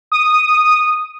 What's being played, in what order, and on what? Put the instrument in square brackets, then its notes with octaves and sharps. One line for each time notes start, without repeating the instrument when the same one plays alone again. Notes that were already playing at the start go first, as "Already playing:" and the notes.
[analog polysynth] D#6